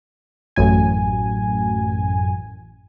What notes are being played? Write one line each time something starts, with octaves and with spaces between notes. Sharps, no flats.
A1 F#2 G#5